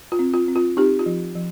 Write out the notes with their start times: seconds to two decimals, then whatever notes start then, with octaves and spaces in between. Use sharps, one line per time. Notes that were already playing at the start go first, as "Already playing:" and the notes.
0.12 F4
0.19 C4
0.34 F4
0.48 C4
0.56 F4
0.77 C4 D#4 G4
0.99 F4
1.06 F3
1.36 F3